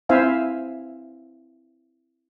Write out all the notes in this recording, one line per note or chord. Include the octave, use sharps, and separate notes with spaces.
C4 E4 C5 E5 F5 G#5